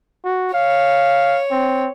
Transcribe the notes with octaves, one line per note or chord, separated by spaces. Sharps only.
F#4
C#5 F5
C4